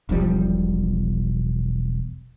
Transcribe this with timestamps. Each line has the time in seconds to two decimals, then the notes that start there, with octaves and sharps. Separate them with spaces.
0.09 E1 B1 F3 G3